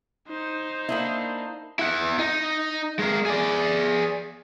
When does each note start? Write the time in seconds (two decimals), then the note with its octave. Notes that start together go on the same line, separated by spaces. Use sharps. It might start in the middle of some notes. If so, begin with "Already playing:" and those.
0.28 D#4 C5
0.89 A#3 D4 E4
1.79 E4 F#5
2.19 D#4
2.99 G#3 A#4
3.26 G#4 D5